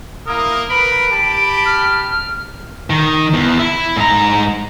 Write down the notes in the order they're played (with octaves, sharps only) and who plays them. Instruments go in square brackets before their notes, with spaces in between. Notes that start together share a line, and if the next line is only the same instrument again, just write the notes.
[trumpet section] A#3 E4 A#4 [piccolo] D#6
[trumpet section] A#4 B4 B5 [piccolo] D7
[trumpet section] G4 A5 B5
[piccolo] F6
[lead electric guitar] D#3
E2
E4
G#2 A#5